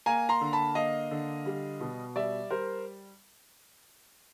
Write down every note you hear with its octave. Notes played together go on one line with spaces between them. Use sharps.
A#3 G#5 A#5
A#5 C6
D3
A5 B5
A#3 D#5 F5
D3
G3
B2
G3 D5 E5
G3 A#4 C5